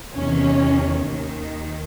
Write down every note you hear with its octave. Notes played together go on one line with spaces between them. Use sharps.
E2 C3 D#3 C#4
D#2 D#3